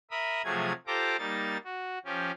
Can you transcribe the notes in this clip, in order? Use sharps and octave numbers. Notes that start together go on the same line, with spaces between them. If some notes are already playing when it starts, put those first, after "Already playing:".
A#4 E5 B5 D#6
C3 F3 F#3 A3 G#4 G#6
F4 G4 A4 C5 A#5 D6
G3 A#3 D#4 A6
F#4
F3 C#4 G4